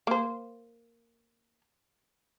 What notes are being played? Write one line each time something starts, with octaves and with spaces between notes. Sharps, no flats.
A#3 C5